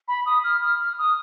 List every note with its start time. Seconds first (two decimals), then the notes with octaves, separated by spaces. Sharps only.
0.08 B5
0.26 D#6
0.44 F6
0.62 F6
0.80 F6
0.98 D#6